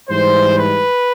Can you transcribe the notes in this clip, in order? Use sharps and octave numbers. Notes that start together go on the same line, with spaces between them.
G#2 E3 G3 C5
B4